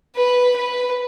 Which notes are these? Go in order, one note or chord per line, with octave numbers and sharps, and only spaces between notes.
B4
B4